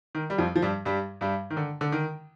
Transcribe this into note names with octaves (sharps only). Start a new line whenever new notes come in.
D#3
G3
F2 F3
F3
G2 G3
G2 G3
G2 G3
D#3
D3
D3
D#3